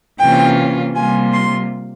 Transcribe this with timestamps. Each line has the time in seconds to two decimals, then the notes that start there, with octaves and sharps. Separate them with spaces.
0.20 C3 E3 A#3 C#4 F4 G5
0.96 C3 G3 A#3 F4 G#5
1.33 C6